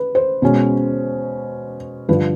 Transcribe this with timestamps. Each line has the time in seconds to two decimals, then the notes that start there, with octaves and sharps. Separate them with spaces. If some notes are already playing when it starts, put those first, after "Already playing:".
Already playing: B4
0.15 C5
0.42 B2 G#3 C#4
2.09 G2 D3 F3 B4